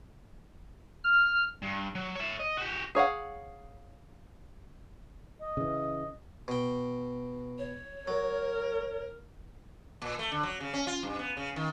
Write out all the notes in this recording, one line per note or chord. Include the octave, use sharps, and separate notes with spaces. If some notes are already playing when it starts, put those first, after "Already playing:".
F6
G2
F#3
C#5 E5
D#5
F#4 G4
G#4 C#5 F5 F#5
D#5
C#3 E3
B2 G5
C#5
F#3 A#4
A#2
A3
D3
F#3
C#3
C#4
F4
G2
B3
C#3
D#3